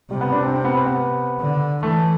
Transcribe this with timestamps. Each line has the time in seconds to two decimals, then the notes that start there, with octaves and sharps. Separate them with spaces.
0.11 C3 G3
0.21 B3
0.32 D4
0.43 C4
0.54 C4
0.65 B3
0.75 C4
0.86 B3
1.40 D3
1.83 E3 A3